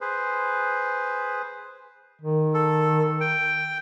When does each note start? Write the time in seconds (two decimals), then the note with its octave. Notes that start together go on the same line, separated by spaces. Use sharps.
0.01 G#4 B4 C5
2.22 D#3
2.54 A4
3.21 G5